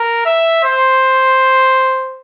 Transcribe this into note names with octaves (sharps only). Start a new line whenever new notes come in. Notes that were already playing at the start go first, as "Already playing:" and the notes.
Already playing: A#4
E5
C5